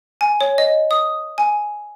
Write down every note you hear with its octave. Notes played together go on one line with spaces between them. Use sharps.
G#5
C#5
D#5
D#6
G#5